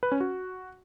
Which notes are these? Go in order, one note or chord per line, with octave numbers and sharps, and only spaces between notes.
B4
C#4
F#4